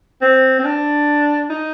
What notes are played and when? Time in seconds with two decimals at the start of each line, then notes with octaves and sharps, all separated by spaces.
0.22 C4
0.59 C4
0.64 D4
1.50 D#4